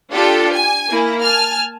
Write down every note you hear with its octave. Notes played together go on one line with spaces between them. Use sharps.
D4 F4 G4 A4
G#5
A#3 E4
G#5 A5 F6